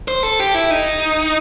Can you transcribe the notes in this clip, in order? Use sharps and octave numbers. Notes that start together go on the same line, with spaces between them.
C5
A4
G4
E4
D#4